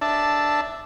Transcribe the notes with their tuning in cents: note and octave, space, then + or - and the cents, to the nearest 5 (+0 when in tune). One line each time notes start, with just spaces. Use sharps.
D4 +5 E5 +0 A5 +0